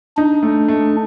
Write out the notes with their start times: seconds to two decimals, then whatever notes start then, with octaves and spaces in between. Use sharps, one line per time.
0.17 D4 D#4
0.43 A3
0.68 A3